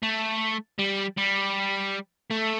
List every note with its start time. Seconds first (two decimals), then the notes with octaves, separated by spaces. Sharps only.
0.03 A3
0.79 G3
1.17 G3
2.31 A3